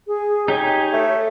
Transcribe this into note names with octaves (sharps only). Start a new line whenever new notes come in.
G#4
D#4 G4 C#5 G#5
A3